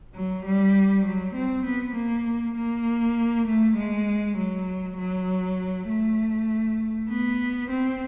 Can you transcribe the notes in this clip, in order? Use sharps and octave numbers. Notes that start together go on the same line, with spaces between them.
F#3
G3
F#3
C4
B3
A#3
A#3
A3
G#3
F#3
F#3
A3
B3
C4